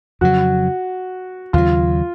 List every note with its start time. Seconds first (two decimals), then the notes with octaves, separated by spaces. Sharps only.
0.21 F2 C#3 F#3 F#4
1.53 D#2 C#3 F#3 F4